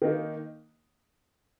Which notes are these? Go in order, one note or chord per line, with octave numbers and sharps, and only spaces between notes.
D#3 A#3 D#4